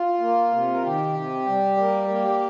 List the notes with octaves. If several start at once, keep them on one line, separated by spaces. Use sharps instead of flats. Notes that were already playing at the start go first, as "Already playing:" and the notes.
Already playing: F4
A#3
C3
A#4
D#3 G4
C3
G3
A#3
A#3